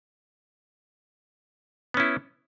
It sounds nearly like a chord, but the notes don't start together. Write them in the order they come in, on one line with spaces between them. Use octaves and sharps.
B3 C#4 E4